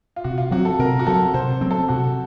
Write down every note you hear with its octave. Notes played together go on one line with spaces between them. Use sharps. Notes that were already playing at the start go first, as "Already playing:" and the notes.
F4
C3 F#4
F4
F#3 C4 F#4
A4
C3 A#4
F#4
F#3 C4 A4
C3 C5
F#3 C4
A4
C3 F#4